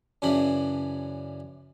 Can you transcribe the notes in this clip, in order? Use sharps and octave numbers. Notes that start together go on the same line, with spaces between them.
F#2 C#3 E3 D4 G#4 B5